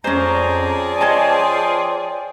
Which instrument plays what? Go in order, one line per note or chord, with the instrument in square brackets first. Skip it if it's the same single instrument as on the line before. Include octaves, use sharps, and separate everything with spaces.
[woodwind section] F2 A#5 [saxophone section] F3 G#4 D5 [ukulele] C#4 C5
[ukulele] C#5 D#5 A5 [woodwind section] G5 C6